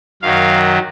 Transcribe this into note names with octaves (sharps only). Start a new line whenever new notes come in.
F#2 D#3 F#3 F5